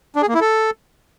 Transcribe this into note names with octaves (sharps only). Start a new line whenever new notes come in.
D4
G#4
A#3
E4
A4